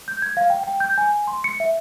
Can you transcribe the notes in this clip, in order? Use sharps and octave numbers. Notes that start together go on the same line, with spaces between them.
G6
G#6
F5
G5
G5
G6
G#5
C6
C#7
E5